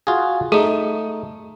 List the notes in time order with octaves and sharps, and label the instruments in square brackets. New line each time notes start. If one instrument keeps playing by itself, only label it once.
[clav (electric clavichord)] F4 F#4 G#4
[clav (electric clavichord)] A3 D#4 [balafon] G#4